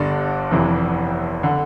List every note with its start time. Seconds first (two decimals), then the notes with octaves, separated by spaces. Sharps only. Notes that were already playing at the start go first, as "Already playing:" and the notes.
Already playing: G1 G2 D3 D5
0.51 F1 F2 E3
1.43 D3